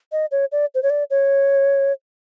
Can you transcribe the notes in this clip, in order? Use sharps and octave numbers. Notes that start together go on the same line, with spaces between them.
D#5
C#5
D5
C5
C#5
D5
C#5